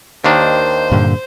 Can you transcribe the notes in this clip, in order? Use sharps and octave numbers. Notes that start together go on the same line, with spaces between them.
D#2 D#3 D4 C5
G2 A#2 D3